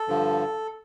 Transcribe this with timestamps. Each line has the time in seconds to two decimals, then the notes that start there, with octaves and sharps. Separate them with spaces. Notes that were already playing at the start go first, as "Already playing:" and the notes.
Already playing: A4
0.08 G2 D3 F3